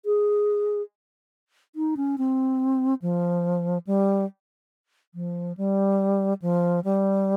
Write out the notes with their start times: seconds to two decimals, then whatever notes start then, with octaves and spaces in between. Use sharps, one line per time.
0.05 G#4
1.75 D#4
1.97 C#4
2.18 C4
3.02 F3
3.87 G3
5.15 F3
5.57 G3
6.42 F3
6.84 G3